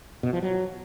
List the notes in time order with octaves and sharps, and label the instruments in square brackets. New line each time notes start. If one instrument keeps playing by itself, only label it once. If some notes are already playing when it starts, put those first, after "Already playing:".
[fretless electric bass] B2
F3
F#3